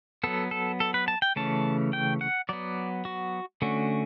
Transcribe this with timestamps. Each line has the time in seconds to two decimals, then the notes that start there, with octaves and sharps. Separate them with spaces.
0.24 F#3 B3 A4
0.51 A4
0.80 A4
0.94 B4
1.08 A5
1.22 G5
1.36 C#3 E3 A3 C#4 A5
1.93 G5
2.21 F#5
2.49 F#3 B3 D5
3.05 F#4
3.62 D3 A3 C#4 F#4